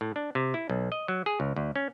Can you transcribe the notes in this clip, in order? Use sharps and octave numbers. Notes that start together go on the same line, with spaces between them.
A2
D4
C3
E4
B1
D#5
F#3
G#4
C#2
D2
C#4